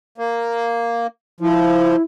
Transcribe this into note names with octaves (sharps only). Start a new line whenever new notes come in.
A#3
F3 E4